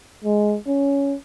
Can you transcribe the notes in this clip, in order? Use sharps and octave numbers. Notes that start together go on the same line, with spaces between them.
G#3
C#4